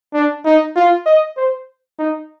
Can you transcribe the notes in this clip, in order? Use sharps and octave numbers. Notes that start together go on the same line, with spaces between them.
D4
D#4
F4
D#5
C5
D#4